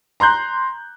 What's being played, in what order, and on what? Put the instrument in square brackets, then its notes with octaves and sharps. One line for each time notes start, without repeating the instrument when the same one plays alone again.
[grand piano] A#5 C6 F#6 G6